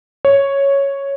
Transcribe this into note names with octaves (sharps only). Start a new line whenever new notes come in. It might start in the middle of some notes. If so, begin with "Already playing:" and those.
C#5